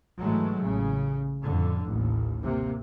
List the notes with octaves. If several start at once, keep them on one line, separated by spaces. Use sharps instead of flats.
G#2 E3 F#3 G#3 A3
A1 C#3
F2 A2 D3
A1 D#2
C3 A#3